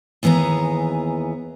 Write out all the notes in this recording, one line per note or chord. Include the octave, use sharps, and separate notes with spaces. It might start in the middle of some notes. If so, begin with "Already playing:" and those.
D#2 E3 B3 G#4 A#5